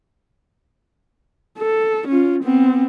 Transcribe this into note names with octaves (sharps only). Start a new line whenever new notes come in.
A4
C#4 F4
B3 C4